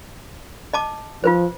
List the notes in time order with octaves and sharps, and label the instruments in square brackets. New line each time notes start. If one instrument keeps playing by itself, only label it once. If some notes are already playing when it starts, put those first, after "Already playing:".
[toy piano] D#5 A5 D6
[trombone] F3 [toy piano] F4 B4 C5